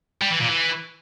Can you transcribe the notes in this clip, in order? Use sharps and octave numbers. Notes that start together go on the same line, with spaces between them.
G3
E3
A#2
E3